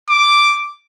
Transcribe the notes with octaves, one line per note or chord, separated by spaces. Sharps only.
D6